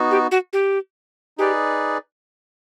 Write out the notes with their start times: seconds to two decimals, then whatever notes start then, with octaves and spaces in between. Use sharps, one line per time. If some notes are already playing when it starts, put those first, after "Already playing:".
Already playing: B3 D#4 F#4
0.11 G4
0.31 F#4
0.53 G4
1.38 D#4 G4 G#4 B4 D5